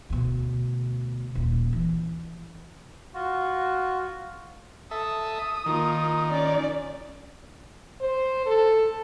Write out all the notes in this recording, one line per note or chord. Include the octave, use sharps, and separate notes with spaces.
D2 B2
D#1 D2
E3
F4 F#4
A4 E5 D#6
D#3 A#3 F4
C#4 D5
C5
A4